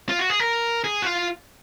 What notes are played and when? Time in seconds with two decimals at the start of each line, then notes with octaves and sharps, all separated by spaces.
0.09 F4
0.19 F#4
0.30 G#4
0.40 A#4
0.84 G#4
1.02 F#4
1.06 F4